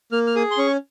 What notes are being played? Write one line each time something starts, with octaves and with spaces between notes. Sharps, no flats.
A#3 F6
F6
G#4 D#6
C6
C#4 C#6